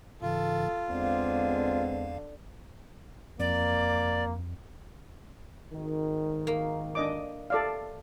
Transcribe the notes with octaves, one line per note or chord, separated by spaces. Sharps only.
G#2 C#3 E3 F4 A4
E2 D3 G#3 B3 C4 F5
F2 A#3 D5
G#1 D#3
A#3
D4 D#5 D6
A4 D5 F5